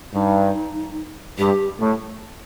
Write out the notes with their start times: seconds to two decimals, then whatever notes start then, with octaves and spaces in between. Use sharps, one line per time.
0.13 G2 D#4
1.38 G2 G4
1.79 A2